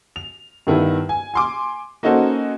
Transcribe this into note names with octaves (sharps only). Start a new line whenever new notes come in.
F7
G2 D#3 B3 E4
G#5
G#5 C6 D6
A#3 C#4 D#4 F#4 A4 C5